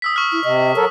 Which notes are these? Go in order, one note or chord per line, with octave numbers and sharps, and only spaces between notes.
D#6 E6 B6
C#6 F6
E4
C3 D#5
F#3 A4 A#4 C#5